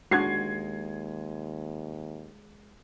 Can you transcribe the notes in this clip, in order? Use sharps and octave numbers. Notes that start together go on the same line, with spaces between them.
D#2 G#3 D4 F#4 G#6 C7